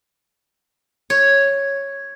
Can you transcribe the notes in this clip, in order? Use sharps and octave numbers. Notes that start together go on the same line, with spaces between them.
C#5